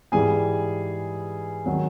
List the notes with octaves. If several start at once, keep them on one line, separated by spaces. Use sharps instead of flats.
G#2 E3 G3 G#4 G#5
D#3 F#3